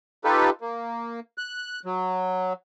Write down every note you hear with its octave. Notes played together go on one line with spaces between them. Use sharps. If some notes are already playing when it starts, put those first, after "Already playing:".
D#4 F4 G4 A4 B4
A#3
F#6
F#3